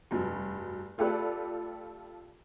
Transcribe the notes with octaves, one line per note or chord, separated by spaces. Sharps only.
F1 G2 F#3
A3 F4 G4 A4 B4 D5